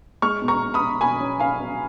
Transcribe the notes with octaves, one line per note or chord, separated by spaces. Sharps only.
G#3 C#6 F6
B2
A#5 C#6
B2
B5 D#6
B2
B2 G#5 B5
C#4
C#4 F5 G#5
B2